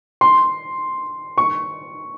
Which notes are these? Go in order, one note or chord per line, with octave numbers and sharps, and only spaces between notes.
C6
C#6